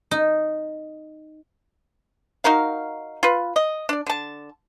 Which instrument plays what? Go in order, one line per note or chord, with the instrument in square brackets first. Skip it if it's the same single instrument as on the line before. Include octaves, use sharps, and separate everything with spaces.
[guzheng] D#4
[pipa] D#4 F#4 A#4 F5
F4 B4
D#5
D4 D5
D3 A5